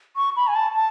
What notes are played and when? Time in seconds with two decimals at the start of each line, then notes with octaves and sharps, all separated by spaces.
0.16 C#6
0.36 B5
0.47 G#5
0.55 A5
0.74 A5